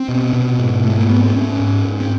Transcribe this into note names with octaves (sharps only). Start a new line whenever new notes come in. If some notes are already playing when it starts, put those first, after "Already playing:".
Already playing: C4
B2
B2
G#2
G#2 A3
A#3
G#2 B3
C4
G#2 C#4
G#2
G#2
C4